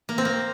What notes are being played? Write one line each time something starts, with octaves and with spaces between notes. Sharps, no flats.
A#3
C4
A#3